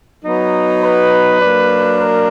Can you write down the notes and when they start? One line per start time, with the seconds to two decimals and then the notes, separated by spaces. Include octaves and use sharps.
0.25 F#3 B3 D#4
0.82 B4
1.40 F#3 A#3 D4
1.97 A#4